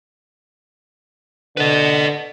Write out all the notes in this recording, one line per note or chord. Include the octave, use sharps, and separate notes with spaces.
D3 B4 D#5